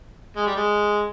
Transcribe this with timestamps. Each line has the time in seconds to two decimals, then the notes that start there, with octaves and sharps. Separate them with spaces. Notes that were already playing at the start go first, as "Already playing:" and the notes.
0.36 G#3
0.46 G3
0.56 G#3